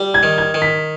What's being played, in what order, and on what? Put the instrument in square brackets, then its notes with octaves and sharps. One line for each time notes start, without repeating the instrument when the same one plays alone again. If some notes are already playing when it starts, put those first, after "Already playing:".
Already playing: [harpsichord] G3
[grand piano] G#6
[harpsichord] D#3
[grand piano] G#6
[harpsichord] D#3
[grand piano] B6